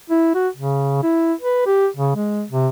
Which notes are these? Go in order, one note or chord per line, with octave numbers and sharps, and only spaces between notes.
E4
F#4
C#3
E4
B4
G4
C#3
G#3
C3